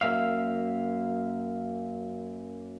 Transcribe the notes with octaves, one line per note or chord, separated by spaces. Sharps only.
F#2 G#3 A#3 E5 F5